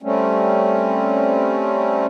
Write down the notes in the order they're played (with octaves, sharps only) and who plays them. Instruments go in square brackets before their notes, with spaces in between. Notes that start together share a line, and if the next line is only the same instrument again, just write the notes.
[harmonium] G3 A3 C4 C#4